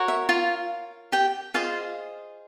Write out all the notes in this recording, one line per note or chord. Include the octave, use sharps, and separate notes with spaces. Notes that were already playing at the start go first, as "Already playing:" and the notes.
Already playing: F#4 A#4 C#5
E5
F4 F5
G4 G5
F4 G#4 C5 D#5 F5